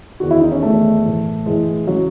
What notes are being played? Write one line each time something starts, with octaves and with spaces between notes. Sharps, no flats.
E2 D#3 F#4
E4
D#4
C#4
E2 D#3 A3
A2 E3
A2 E3 G#3
C#3 E3 F#3